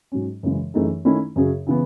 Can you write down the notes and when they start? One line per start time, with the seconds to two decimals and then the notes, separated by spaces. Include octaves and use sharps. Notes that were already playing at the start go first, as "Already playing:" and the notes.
0.12 G#2 F#3 C#4
0.43 F#2 C#3 E3 G#3
0.74 F#2 E3 A3 D#4 G#4
1.05 D#3 A3 C#4 E4
1.36 F#2 C#3 F#3 C#4 G#4
1.67 C#3 E3 B3